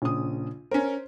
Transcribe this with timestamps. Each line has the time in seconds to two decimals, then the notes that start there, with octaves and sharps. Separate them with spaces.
0.02 A#1 C#3 D#6
0.71 C#4 A#4 C5